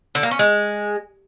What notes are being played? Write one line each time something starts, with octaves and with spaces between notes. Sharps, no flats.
D3
A#3
C#4
G#3